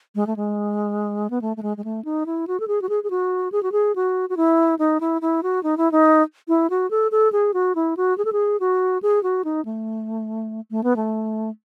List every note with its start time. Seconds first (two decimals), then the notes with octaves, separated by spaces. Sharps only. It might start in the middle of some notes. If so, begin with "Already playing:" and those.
0.15 G#3
0.27 A3
0.36 G#3
1.30 B3
1.42 A3
1.57 A3
1.63 G#3
1.77 G#3
1.84 A3
2.05 D#4
2.26 E4
2.47 F#4
2.60 A4
2.68 G#4
2.82 F#4
2.89 G#4
3.04 G#4
3.10 F#4
3.52 G#4
3.63 F#4
3.72 G#4
3.96 F#4
4.30 F#4
4.37 E4
4.79 D#4
5.01 E4
5.22 E4
5.43 F#4
5.63 D#4
5.78 E4
5.92 D#4
6.48 E4
6.70 F#4
6.91 A4
7.12 A4
7.32 G#4
7.54 F#4
7.75 E4
7.97 F#4
8.18 G#4
8.25 A4
8.33 G#4
8.60 F#4
9.03 G#4
9.23 F#4
9.45 D#4
9.65 A3
10.71 A3
10.84 B3
10.96 A3